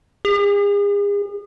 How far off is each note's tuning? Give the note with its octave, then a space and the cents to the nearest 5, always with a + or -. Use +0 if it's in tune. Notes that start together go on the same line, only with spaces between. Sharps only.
G#4 -40